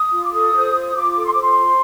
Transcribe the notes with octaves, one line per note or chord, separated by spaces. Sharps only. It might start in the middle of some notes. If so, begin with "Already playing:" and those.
Already playing: D#6
F4
D6
A4 D#6
C5
F4
F4 D6
A4
C6
C5 D6
C6
F4